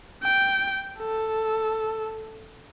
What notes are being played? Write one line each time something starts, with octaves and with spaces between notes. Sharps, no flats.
G5
A4